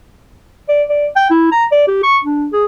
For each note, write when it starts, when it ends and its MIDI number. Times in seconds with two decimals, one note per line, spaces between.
0.69 0.83 74
0.89 1.07 74
1.16 1.27 79
1.30 1.50 64
1.52 1.65 82
1.72 1.86 74
1.88 2.01 67
2.03 2.18 85
2.24 2.48 62
2.53 2.65 68